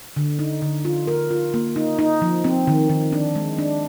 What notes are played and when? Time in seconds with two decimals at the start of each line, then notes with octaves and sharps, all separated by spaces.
0.16 D3
0.39 D#4
0.62 D3
0.85 F4
1.07 A#4
1.30 F4
1.54 A#3
1.76 D#4
1.99 D#4
2.22 F3
2.44 C4
2.67 D#3
2.90 D#3
3.12 D4
3.35 G#3
3.58 D4